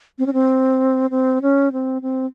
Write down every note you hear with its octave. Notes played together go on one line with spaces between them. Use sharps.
C4
C#4
C4
C4
C#4
C4
C4